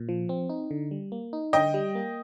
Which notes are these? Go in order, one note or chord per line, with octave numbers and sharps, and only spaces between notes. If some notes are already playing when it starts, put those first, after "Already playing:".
Already playing: A#2
F3
C4
D#4
D3
G3
A#3
D#4
D3 D#5 G5
G3
A#3